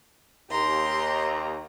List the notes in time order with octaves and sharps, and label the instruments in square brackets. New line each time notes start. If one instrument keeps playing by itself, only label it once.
[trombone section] D#2 [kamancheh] G4 A#5 [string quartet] C6